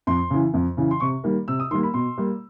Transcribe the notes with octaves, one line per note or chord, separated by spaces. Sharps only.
F2 C6
C#3 E3
F2
C#3 E3
C6
C3 C#6
D#3 G3 A#3
C3 E6
D#6
D#3 G3 A#3 C6
B5
B2 C6
G3 A#3